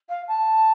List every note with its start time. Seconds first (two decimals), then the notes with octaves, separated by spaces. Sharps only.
0.09 F5
0.28 A5